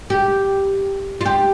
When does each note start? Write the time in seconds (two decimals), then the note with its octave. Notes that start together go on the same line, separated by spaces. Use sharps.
0.10 G4
1.21 F4
1.26 G4